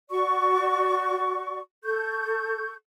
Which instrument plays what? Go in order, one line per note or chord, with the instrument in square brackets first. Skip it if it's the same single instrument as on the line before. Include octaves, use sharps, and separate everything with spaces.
[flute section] F#4 D5 C#6
A4 C#6 G6